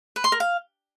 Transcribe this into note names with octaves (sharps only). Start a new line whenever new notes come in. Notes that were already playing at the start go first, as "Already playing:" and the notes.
B4
C6
A#4
F5